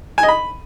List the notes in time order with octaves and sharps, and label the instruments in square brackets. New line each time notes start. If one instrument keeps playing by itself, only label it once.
[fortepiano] G#5
D#5
B5